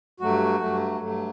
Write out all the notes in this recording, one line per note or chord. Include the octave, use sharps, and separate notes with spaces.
G2 F#3 A3 F#4
G2 F#3 A3
G2 F#3 A3